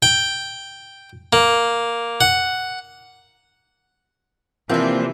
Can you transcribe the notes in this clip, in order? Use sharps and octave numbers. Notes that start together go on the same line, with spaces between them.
G5
A#3
F#5
C3 E3 F3 A#3 C4 D4